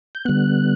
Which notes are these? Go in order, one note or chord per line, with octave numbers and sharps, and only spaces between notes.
G6
D3 G3 B3 F#6